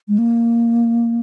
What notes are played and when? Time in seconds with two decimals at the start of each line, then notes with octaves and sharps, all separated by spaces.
0.08 G#3
0.18 A#3